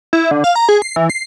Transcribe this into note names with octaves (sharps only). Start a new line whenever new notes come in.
E4
D3
F5
A#5
G#4
C7
E3
C7